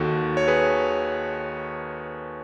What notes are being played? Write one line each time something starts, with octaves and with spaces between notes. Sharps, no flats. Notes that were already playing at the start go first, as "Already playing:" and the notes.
Already playing: D#2 D#3 F#4 A4
C#5
G#4 B4